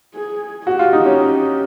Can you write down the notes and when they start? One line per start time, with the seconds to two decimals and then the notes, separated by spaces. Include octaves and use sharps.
0.15 G#4
0.66 F#4 G4
0.79 F4
0.93 D#4
1.05 C#4